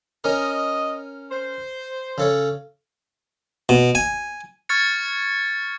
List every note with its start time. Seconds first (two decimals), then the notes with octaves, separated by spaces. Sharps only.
0.24 C#4 A#4 D#5
1.31 C5
2.18 C#3 A4 C#5
3.69 B2
3.95 G#5
4.69 C#6 F6 G#6 A6 C#7